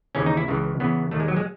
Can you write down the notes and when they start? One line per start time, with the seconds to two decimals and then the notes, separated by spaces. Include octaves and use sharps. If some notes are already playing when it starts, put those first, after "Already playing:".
0.15 D#2 C#3 E3 C#4
0.26 D#4
0.37 E4
0.48 C#2 C#3 E3
0.80 E2 C#3 E3 B3
1.11 D#2 D#3 A3
1.20 G#3
1.28 F#3
1.37 G#3